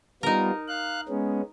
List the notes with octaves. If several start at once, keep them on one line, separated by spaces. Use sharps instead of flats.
G3 B3 D#4 F4 A#4
F5 F#6
G#3 B3 C#4